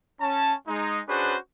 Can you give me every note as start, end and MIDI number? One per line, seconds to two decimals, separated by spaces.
0.21 0.54 61
0.21 0.54 81
0.68 1.00 56
0.68 1.00 63
1.09 1.36 61
1.09 1.36 62
1.09 1.36 66
1.09 1.36 68
1.09 1.36 71
1.09 1.36 72